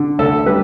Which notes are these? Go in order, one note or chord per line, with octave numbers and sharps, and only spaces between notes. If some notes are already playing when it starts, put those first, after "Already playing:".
Already playing: D3
D2 A4
G3 B4